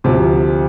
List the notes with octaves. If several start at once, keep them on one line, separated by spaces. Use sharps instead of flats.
D2 C3 F3